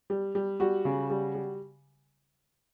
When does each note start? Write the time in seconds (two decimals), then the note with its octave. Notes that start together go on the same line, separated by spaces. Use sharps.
0.10 G3
0.35 G3
0.60 G3 F#4
0.85 C#3
1.10 G3
1.35 G3